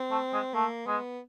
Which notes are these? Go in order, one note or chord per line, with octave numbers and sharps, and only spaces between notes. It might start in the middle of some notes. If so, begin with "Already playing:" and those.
Already playing: C4
A3
G#3
A3 A#3
G#3 B3